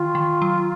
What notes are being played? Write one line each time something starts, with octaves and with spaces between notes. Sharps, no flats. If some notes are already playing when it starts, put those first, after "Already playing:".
Already playing: D#3 F4
D#3
F#3